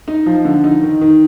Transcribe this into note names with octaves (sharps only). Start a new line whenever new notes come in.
D#4
F3
D3
D#4
D#3
D#3